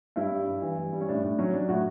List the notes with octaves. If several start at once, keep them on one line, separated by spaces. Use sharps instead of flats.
G2 E4
G3
G2
E3
G2
G3
C#4
A2 D4
A2 D4
F#3 C#4
F#3 D4
A2 F#4